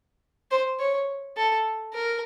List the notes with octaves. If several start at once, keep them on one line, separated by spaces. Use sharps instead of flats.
C5
C#5
A4
A#4